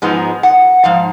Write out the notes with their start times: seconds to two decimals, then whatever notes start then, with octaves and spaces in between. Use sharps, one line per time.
0.02 G#2 F3 G#3 B3 D#4
0.43 F#5
0.84 G#2 F3 F5